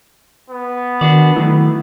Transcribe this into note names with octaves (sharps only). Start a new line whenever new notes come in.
B3
D#3 D4 F#4 D5
D#3 F#3 A3 E4